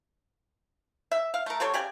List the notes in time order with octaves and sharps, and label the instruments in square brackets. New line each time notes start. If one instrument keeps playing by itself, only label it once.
[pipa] E5
F5
A3 A#4
G3 C4 A4 C#5
C#3 G4 D5 G#5